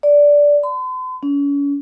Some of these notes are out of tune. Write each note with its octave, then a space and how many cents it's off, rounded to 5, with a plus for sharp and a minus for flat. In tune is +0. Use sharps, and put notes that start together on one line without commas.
D5 -10
C6 -45
C#4 +35